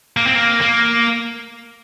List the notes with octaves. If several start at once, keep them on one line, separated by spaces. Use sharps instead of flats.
A#3
C4
A#3
A#3